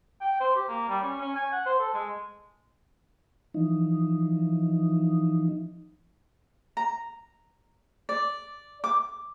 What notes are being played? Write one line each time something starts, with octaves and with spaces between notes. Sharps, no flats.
G5
C5
G4
A#3
G3
C#4
C#4
G#5
F#5
C5
A4
G#3
E3 F3 D#4
A#5
D5
D6